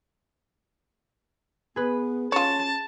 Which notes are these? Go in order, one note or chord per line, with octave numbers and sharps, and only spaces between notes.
B3 G#4 B4
C#4 F4 C#5 A5